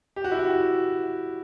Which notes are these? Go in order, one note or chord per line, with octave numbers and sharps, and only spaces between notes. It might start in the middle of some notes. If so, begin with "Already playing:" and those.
G4
F#4
E4
F#4